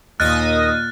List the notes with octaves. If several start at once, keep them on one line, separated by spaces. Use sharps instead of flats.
D#2 A#2 D#5 D#6 F6 F#6 A6